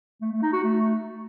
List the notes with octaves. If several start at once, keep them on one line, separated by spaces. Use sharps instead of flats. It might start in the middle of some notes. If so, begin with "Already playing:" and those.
A3
A3
D#4
F#4
A3